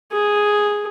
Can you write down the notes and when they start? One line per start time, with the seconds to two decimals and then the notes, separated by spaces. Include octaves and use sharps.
0.12 G#4